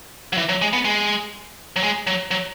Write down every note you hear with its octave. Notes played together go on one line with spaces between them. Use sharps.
F#3
E3
F#3
G#3
B3
G#3
F#3
G#3
F#3
F#3